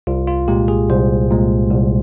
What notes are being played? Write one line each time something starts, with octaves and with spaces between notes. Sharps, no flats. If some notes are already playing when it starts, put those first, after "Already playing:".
C2 F4
F4
A#2 G#3 G4
G#4
C2 C5
A#2 G#3
C2